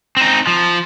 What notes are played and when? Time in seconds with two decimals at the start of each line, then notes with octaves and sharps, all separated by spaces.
0.17 C4 D#4
0.47 F3